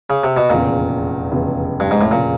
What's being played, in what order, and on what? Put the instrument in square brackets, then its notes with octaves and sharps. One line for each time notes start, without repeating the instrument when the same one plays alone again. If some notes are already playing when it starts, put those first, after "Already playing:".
[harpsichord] C#3
C3
B2
[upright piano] F1 E2 C#3 [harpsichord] A#2
[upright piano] F1 E2 C#3
[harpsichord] G2
G#2
A2
[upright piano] F1 C#3 [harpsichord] A#2